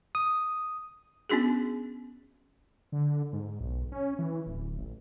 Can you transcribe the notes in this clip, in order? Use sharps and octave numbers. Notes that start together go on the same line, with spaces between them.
D#6
B3 C#4 D4 F#4 G#4
D3
G#2
B1
C#4
E3
D1
A1